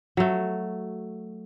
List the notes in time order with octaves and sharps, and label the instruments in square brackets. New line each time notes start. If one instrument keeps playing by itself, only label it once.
[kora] F#3 A3